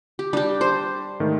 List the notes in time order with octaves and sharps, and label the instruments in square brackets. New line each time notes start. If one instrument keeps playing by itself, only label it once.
[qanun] G4
[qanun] G3 G4 [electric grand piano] D4
[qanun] C5
[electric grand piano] G#2 D#3 A3